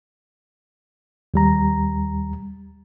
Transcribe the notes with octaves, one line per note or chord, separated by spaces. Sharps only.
D#2 G3 A#5